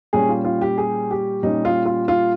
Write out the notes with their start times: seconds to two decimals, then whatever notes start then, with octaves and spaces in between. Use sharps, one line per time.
0.13 A#2 G3 C#4 G#4
0.29 F4
0.45 F4
0.61 G4
0.78 G#4
1.11 G4
1.42 A#2 G3 C#4 D#4
1.65 F4
1.85 F4
2.08 F4